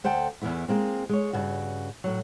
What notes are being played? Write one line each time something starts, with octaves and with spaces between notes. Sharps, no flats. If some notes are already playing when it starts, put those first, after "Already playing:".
D2 C5 F#5 G5 A5
E2 G2 E3 B3 E4
G#3 A#3 C4
G#3 C#5
G2 C#3 F#4
A2 F#3